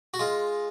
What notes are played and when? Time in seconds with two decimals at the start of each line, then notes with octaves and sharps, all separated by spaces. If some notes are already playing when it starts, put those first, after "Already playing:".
0.14 F#4
0.19 G#3 F4